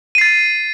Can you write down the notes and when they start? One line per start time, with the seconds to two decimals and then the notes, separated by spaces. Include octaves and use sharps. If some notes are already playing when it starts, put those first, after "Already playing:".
0.15 D#7
0.18 C7
0.21 A6